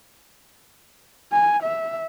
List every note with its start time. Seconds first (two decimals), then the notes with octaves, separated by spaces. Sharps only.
1.32 G#5
1.63 E5